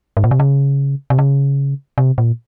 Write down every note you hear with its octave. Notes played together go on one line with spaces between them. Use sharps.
G#2
A#2
C3
C#3
C3
C#3
C3
A#2